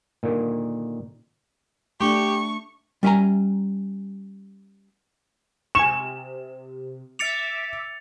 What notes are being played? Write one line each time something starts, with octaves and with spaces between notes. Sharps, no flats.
A#2 D3 D#3
A3 D4 G4 C#6
G3 C#4 E5 F5 G#5 A#5
C3 G#5 C#6 E7
E5 D6 A6 C#7 F7